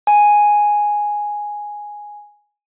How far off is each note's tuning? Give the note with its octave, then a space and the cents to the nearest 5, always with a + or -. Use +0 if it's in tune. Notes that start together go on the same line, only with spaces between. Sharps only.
G#5 +0